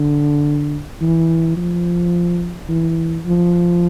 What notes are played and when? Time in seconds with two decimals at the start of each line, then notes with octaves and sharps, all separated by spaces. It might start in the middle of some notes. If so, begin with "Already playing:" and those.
Already playing: D3
1.01 E3
1.57 F3
2.69 E3
3.26 F3